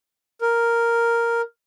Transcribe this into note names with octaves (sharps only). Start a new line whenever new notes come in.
A#4